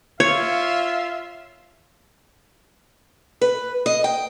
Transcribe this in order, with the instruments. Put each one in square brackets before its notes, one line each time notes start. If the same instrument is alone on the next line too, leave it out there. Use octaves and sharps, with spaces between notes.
[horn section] F4 E5 F5 [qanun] C#5
[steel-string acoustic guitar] B4
D#5
G5